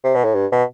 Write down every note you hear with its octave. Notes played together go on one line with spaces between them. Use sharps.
C3
B2
A2
G2
B2